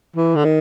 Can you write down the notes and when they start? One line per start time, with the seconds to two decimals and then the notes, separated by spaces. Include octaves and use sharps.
0.16 E3
0.36 D3
0.45 D#3